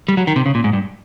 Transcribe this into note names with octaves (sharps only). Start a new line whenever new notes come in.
G3
F#3
D#3
C3
C#3
A#2
G#2
G2